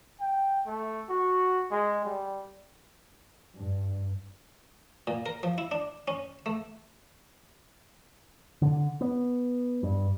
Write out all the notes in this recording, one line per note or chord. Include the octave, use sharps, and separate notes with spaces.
G5
A3
F#4
G#3
G3
G2
A#2
A#4
F3
E4
D4
C#4
A3
D3
B3
G2